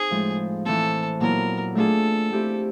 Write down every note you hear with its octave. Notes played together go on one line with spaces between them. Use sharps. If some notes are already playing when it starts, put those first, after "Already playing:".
Already playing: C4 D#4 G#4
A2 F3 G#3
E3 A3 C4 A4
A#2 F#3 B3 E4 A#4
A3 D4 F4 G#4 A4
A3 C4 E4 G4